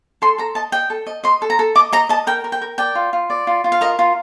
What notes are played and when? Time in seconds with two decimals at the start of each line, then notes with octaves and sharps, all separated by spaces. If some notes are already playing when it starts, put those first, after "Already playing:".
0.22 A4 C6
0.38 A4 A#5
0.55 D#5 A5
0.72 D#5 G5
0.90 A4
1.07 D#5
1.24 D#5 C6
1.42 A4
1.50 A#5
1.59 A4
1.75 D#5 D6
1.93 D#5 A#5
2.09 D#5 A5
2.27 A#4 G5
2.44 A#4
2.52 G5
2.62 A#4
2.78 D5 G5
2.95 F4
3.13 F4
3.30 D5
3.47 F4
3.64 F4
3.72 F5
3.81 A#4 D#5
3.99 F4